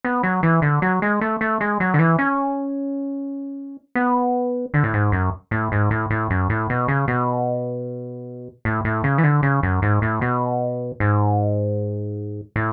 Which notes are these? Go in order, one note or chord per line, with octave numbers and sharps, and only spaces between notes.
B3
F#3
E3
D3
F#3
G#3
A3
A3
G#3
F#3
D3
E3
C#4
B3
D3
A2
G#2
F#2
A2
G#2
A2
A2
F#2
A2
B2
C#3
B2
A2
A2
C#3
E3
D3
C#3
F#2
G#2
A2
B2
G#2
A2